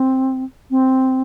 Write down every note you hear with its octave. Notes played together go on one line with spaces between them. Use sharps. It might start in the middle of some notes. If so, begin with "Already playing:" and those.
Already playing: C4
C4